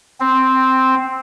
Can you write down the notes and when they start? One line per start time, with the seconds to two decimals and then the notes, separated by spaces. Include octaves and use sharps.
0.20 C4